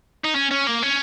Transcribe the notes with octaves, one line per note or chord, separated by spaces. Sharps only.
D#4
C#4
C#4
A#3
C#4